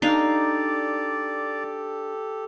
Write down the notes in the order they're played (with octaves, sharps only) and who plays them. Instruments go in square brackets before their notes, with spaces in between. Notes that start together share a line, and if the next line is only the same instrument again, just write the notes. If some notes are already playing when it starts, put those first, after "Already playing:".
[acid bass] D4 [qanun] D#4 F5 [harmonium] G4 A4 [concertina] D5